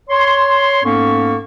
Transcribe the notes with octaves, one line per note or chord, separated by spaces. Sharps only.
C#5 C6
G#2 A#3 B3 C#4 A4 C#6